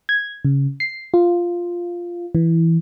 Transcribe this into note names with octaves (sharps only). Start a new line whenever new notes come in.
G#6
C#3
C7
F4
E3